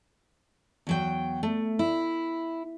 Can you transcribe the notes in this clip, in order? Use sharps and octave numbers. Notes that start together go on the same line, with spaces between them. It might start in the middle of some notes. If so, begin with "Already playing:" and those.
E2 F#3 G5
A3
E4